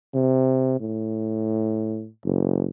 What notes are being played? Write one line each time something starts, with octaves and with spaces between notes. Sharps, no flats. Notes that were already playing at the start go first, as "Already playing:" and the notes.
C3
A2
F#1